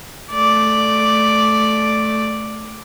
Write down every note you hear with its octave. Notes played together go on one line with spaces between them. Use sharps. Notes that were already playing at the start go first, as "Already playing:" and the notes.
A3 D5